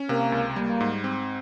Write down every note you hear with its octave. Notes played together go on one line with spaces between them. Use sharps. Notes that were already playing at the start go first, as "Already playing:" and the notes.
Already playing: C#4
C3 A#3
C#2
G3 A#3
G#2
C4